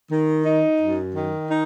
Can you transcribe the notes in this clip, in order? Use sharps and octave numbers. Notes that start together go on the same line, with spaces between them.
D#3
D#4
F#2
D#3
D#4